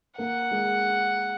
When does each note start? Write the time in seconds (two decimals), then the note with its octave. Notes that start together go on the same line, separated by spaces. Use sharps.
0.18 A#3 A#4 F#5
0.51 G#3 G#4